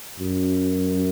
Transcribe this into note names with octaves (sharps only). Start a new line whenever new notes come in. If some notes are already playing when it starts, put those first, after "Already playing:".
F#2